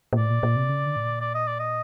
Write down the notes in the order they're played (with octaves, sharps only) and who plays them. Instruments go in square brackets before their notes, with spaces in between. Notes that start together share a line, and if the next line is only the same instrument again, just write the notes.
[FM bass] A#2
[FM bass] A2 [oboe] D5
[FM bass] A#2
A#2
C3
C#3
D3
A2
A#2
[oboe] D5
D#5
D5
D#5